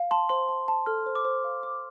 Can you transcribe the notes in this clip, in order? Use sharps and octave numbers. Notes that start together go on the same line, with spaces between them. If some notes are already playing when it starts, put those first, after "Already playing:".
Already playing: F5
A5 C6
C5 C6
A5
A5
A4 F6
C5
D6
C5
F5
D6